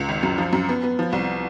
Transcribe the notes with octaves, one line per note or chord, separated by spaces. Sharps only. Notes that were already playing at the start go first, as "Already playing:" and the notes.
Already playing: C#2
G#1
F#2
F3
F#2
B3
B3
F3
C2